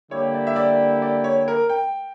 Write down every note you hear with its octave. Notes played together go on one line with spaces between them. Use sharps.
D3 G3 A#3 E4 G4 C#5
D5
E5
D5
D5
C#5
A#4
G5